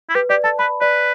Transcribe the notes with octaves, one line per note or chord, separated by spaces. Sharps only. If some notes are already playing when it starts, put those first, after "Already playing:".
E4
G4 B4
G4 D5
A4 A5
B4 B5
B4 D5